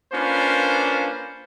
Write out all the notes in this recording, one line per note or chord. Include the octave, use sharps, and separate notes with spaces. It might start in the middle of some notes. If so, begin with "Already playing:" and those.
A#3 C#4 D4 F4 B4 C5